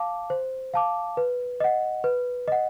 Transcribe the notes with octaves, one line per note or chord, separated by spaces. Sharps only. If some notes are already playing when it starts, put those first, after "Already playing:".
Already playing: F5 A5 D6
C5
F5 A5 D6
B4
D#5 F#5
B4
D#5 F#5